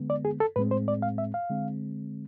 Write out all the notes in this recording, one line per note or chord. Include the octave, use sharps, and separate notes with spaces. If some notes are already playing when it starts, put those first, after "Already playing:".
Already playing: D3 G#3 B3
D5
G#4
A4
A2 G#3 C4 B4
C5
D5
F5
E5
F5
D3 G#3 C4